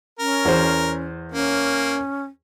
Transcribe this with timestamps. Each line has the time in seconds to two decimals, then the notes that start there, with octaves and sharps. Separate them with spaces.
0.19 C#4 A#4
0.45 E2 C5
1.32 A#3 C#4